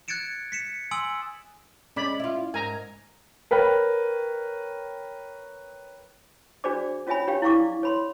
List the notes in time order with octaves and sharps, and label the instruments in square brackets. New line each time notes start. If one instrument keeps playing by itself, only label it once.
[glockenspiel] F#6 G#6 A6 C#7 D7 E7
B6 C#7 E7
G#5 C6 D#6 E6 D7 F#7
[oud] G#3 [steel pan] C#4 D5 B5
[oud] E4 F4
[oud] G#2 A#4 [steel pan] G#5 A#5
[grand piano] A#4 B4 C#5 G5
[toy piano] D4 F#4 G#4 C5 D5 D6
C#4 F4 C#5 E5 G#5 B5
D4 F4 G4 C#5 F5 G5
E4 D5 F5 C#6 D6
C#5 B5 C6